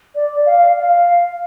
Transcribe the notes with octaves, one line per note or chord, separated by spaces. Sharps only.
D5
F5
F5